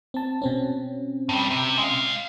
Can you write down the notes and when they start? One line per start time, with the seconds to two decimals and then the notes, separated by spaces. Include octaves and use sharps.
0.14 C4 A5
0.42 B2 C4 C#4
1.29 A2 G3
1.51 C3
1.79 G#3 F5